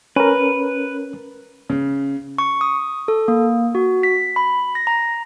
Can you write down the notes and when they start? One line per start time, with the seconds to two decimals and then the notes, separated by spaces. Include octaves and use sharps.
0.16 C#4 A#4 B4
1.70 C#3
2.38 C#6
2.61 D#6
3.08 A4
3.28 A#3
3.75 F#4
4.03 B6
4.36 B5
4.75 A#6
4.87 A#5